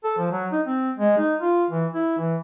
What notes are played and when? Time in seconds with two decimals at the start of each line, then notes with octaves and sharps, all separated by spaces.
0.04 A4
0.18 F3
0.31 F#3
0.52 D#4
0.66 C4
0.98 G#3
1.18 D#4
1.41 F4
1.70 E3
1.94 E4
2.19 E3